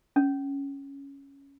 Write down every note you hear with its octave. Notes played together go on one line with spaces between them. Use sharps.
C#4